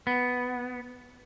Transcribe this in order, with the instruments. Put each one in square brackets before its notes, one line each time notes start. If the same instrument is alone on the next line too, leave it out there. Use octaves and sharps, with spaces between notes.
[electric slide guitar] B3